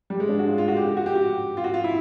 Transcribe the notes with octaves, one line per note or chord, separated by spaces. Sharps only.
G3
G#3
D4
F#4
F4
F4
F#4
G4
G4
F#4
G4
F#4
F4
F#4
F4
E4